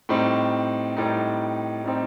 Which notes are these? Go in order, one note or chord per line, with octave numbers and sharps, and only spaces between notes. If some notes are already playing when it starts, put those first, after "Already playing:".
A2 G3 C4 D#4
A2 G3 C4 D#4
A2 G3 C4 D#4